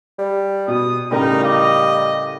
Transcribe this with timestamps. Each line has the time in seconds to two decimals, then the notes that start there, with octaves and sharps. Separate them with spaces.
0.19 G3
0.68 B2 D#6
1.11 A2 C#3 G3 D#4 A#4
1.44 D#5 F5 D6